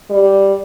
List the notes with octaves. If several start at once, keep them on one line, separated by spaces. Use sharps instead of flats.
G3